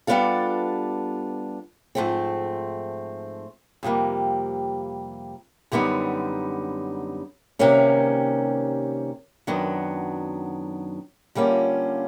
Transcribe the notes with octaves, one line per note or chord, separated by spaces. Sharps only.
G3 B3 D4 F4 A4
G#2 F3 A3 C4
F2 C3 E3 G3 A#3
F#2 D3 G3 B3 D#4
C3 D#3 G3 A#3 C#4
F#2 D#3 F#3 B3 D4
D3 G3 A#3 C#4 F4